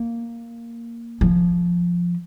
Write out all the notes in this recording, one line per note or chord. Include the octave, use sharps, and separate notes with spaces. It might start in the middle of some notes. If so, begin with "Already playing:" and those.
Already playing: A#3
F3